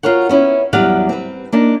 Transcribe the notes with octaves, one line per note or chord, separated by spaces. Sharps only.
F4 F#4 A#4 C#5 F#5
B3 C#4 E4
E2 F#3 G3 G4 F5 F#5
C4 B4
A#3 D4 D#4